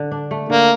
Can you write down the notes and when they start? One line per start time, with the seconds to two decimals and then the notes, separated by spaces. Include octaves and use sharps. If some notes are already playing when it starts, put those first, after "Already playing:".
Already playing: D3
0.11 D4
0.31 A3
0.49 D3 A#3